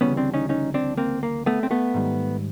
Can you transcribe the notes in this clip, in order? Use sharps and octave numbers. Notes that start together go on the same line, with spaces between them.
D2 C#3 E3 G3 B3 C#4
C4 D4
C#4 D#4
C#4 D#4
C4 D4
A#3 C4
A#3
A3 B3
C4
A3 B3
G#2 D#3 G3